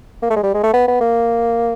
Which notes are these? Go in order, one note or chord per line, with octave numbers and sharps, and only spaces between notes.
A#3
A3
G#3
G3
G#3
A3
B3
B3
A#3